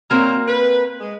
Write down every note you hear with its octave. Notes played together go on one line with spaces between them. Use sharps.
F#3 A#3 C4 A#4
B4
G#3